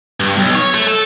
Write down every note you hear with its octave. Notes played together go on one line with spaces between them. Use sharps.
G2
B1
C#5
A3
A4